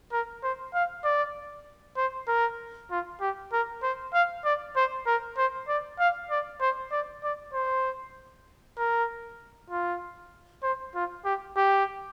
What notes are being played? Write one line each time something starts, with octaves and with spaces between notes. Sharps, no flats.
A#4
C5
F5
D5
C5
A#4
F4
G4
A#4
C5
F5
D5
C5
A#4
C5
D5
F5
D5
C5
D5
D5
C5
A#4
F4
C5
F4
G4
G4